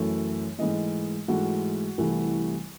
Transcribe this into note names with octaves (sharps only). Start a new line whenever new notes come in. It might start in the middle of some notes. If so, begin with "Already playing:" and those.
Already playing: F#2 E3 A3
G#2 E3 A3 D#5
G#2 E3 A3 F#4
C2 C3 E3 A3